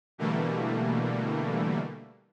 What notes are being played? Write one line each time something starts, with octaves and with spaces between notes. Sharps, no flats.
B2 D3 E3 G3 A3 A#3